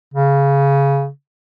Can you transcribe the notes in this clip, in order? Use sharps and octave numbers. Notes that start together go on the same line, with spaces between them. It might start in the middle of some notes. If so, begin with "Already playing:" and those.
C#3